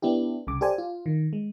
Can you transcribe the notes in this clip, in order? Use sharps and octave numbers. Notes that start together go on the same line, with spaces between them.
B3 D4 E4 G4
C2 C#3 D6
G4 A4 C5 D5 G#5
F4
D#3
G#3